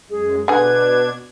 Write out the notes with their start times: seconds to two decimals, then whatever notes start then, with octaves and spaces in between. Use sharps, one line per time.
0.10 F#2 G#3 G#4
0.48 B2 D3 D4 G#4 B4 G#6